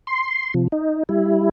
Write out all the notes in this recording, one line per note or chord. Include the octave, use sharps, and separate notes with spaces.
C6
C3 F3
D#4
G3 E4